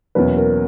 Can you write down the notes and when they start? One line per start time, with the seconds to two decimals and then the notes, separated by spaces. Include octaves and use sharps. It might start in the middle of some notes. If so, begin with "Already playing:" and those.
0.15 E2 B2 F#3 A#3 C#4 B4
0.37 A#4